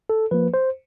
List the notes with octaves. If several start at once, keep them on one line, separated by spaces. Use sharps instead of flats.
A4
F3 A#3 B4
C5